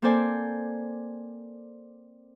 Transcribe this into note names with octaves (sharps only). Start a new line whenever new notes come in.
A#3 C4 A4 C5 D5 G#5